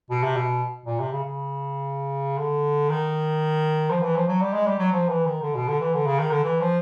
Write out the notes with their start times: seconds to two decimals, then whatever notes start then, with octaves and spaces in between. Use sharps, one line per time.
0.10 B2
0.23 C3
0.36 B2
0.86 A#2
1.00 C3
1.12 C#3
1.24 C#3
2.38 D3
2.89 D#3
3.90 F3
4.03 E3
4.16 F3
4.28 F#3
4.41 G3
4.53 G#3
4.67 G3
4.79 F#3
4.92 F3
5.09 E3
5.25 D#3
5.42 D3
5.55 B2
5.68 D3
5.80 E3
5.94 D3
6.06 C#3
6.19 D#3
6.31 D3
6.44 E3
6.61 F3